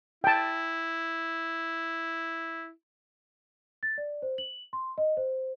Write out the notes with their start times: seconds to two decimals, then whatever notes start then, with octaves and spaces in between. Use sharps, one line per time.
0.24 E4 G5 A5
3.83 A6
3.98 D5
4.22 C5
4.38 F#7
4.73 C6
4.98 D#5
5.17 C5